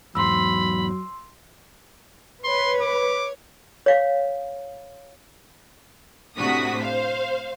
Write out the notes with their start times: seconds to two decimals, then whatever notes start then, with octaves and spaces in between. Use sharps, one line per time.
0.15 E2 G#2 F#3 B5 C6 E6
2.44 B4 C#5 C6
2.81 D6
3.86 C#5 F5
6.38 A2 C3 D4 F#4 D#6 B6
6.79 C5 F5